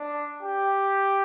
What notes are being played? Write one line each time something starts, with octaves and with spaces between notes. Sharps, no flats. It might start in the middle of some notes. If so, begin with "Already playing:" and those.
Already playing: D4
G4